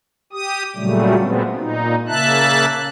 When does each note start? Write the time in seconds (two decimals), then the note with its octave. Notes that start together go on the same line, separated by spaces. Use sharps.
0.33 G4 D#6
0.76 A#2 C#3 F#3 G3 A3
1.19 A#2 G#3 B3 C4
1.56 A#2 D#4
2.08 C#3 A#3 E5 A5 F#6